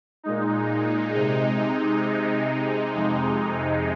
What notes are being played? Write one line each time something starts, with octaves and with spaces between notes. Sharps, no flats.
A#2 G#3 D#4
C3 G#3 D#4
C3 G#3 D#4
F2 C3 G#3 D#4